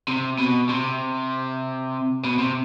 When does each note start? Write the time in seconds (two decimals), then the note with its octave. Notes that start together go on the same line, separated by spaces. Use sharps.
0.08 C3
0.39 B2
0.69 C3
2.24 B2
2.39 C3